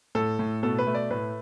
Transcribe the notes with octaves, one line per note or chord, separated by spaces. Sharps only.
A2 A4
A2
B2 A4
B4
A3
D5
A2 B4